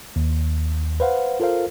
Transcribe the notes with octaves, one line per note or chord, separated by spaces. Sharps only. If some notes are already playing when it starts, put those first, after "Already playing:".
D#2
B4 C5 F5 F#5
F4 A4 A#4 C5 F5